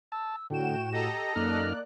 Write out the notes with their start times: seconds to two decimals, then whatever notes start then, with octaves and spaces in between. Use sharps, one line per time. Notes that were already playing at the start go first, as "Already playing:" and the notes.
0.12 A5 E6
0.50 A2 D3 F#4 G5 E7
0.93 G4 A4 D#5 A#5 A#6
1.36 F#2 A#3 D#4 D5 F6 F#6